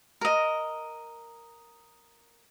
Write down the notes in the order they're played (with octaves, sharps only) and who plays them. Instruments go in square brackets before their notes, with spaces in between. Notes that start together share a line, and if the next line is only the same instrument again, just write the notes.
[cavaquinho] A#4 D#5